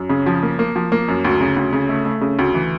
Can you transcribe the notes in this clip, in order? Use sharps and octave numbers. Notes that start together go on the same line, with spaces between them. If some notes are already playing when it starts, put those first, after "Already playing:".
Already playing: F#2
C#3
F3
A#3
A#3
F3
A#3
F#2
D2
C#3
D2
C#3
A3
A3
C#3
D2
E3